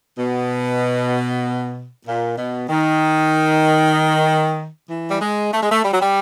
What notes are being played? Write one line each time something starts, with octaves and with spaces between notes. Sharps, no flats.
B2
A#2
B2
D#3
E3
G3
G#3
A3
G#3
A3
G3
F#3
G3